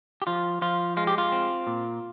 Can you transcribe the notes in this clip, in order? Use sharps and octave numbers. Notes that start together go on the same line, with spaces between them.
G4
F3 F4
F3 F4
G#3 F4
G4
F4
C4
A#2